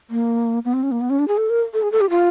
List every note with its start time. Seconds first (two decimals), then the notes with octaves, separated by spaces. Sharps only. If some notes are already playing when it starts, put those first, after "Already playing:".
0.10 A#3
0.65 B3
0.74 C4
0.83 C#4
0.91 A#3
1.01 B3
1.10 C#4
1.19 D4
1.28 G#4
1.37 A4
1.50 A#4
1.74 A4
1.82 G#4
1.92 A4
2.01 G4
2.10 F4